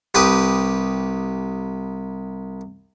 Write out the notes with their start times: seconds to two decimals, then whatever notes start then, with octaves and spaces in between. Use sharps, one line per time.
0.15 C2 G4 B4 D#6